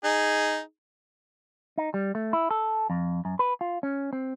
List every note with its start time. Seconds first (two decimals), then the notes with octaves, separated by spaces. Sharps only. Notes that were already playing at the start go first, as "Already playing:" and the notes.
0.04 D#4 G#4
1.78 D#4
1.94 G3
2.15 A3
2.33 E4
2.51 A4
2.90 F2
3.25 F#2
3.39 B4
3.61 F4
3.83 C#4
4.13 C4